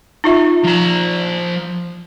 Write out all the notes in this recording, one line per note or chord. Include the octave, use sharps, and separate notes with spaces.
D#4 F4 E5
F3 A#5